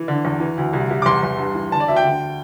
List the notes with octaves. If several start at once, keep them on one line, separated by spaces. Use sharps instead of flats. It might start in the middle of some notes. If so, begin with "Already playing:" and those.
Already playing: E3
D3
E2
E3
D2
C2
C2
D6
E2 C6
E2
G2
E3
D3 A5
D5
D2 E5
G5
D3